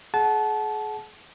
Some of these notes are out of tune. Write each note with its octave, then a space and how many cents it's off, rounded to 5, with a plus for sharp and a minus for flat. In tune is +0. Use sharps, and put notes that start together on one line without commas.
G#4 +35 F#5 +10 A5 -25